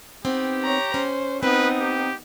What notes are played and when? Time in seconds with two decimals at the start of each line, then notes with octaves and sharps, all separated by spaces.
0.25 B3 C4 D#4 G4
0.63 C#5 A#5
0.94 C#4 C5
1.43 B3 C4 D#4 B4
1.80 G4